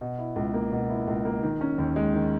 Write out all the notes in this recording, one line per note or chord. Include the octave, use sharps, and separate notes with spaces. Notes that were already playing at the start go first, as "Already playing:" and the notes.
B2
E4
C#2
A#3
B2
E4
C#2
A#3
D#3
C#4
D#2
G#3
D#3